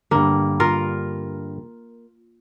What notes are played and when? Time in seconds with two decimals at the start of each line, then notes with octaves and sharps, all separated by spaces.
0.11 G2 D3 A#3
0.60 F4 A#4